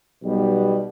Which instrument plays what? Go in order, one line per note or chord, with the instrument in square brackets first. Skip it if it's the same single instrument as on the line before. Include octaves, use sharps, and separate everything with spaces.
[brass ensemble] B1 B2 G3